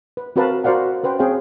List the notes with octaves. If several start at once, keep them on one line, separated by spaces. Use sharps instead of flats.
B4
C4 F#4 A#4 B4 F5 A5
F#4 A#4 C5 D5 F5 F#5
C#4 B4 C5 G5
C4 G#4 C#5 F5 G5